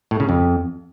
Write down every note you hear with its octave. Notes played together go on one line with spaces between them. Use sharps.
A2
C#3
F2